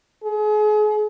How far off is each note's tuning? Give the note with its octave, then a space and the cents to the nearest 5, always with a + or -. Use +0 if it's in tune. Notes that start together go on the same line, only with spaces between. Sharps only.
G#4 +35